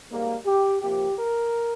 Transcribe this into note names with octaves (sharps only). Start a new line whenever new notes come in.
G#2 G3 A#3
G4
C3 F3 A#3 G4
A#4